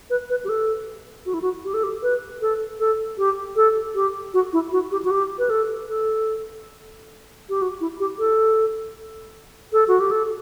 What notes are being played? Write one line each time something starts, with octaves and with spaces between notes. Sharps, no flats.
B4
B4
G4
A4
F#4
E4
F#4
G4
A4
G4
B4
A4
A4
G4
A4
G4
F#4
E4
F#4
G4
F#4
G4
B4
A4
A4
G4
F#4
E4
G4
A4
A4
F#4
G4
A4